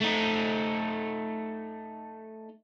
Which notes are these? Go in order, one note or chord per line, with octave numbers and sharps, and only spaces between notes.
A3 D#4